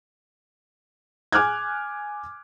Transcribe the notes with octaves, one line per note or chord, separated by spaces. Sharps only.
G#5 D6 F6 F#6 G#6